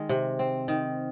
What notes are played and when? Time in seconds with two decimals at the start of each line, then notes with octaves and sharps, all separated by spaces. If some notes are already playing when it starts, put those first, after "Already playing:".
Already playing: D#3 G#3
0.09 C3
0.39 C4
0.68 D#3